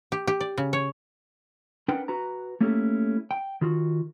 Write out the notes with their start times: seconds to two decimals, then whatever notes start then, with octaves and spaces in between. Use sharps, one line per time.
0.12 G4
0.27 G4
0.40 D5
0.58 C#3
0.73 C#5
1.88 C#4 D4 A#4 B4 F#5 G5
2.08 F#4 B4 A#5
2.60 A3 A#3 C#4 E4 G4 A4
3.31 G5
3.61 D#3 F4 F#4